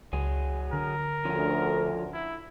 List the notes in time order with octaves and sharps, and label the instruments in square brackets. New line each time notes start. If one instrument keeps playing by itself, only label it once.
[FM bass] C#2 [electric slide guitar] F#3 G#4
[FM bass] D3 [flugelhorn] A#4
[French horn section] D2 [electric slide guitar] F3 C#4
[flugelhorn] E4